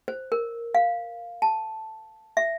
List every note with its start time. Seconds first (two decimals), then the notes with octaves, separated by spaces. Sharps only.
0.08 C5
0.32 A#4
0.75 F5
1.42 A5
2.37 E5